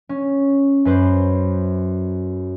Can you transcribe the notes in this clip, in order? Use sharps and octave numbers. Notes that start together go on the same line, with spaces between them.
C#4
F#2 B4 C5 G6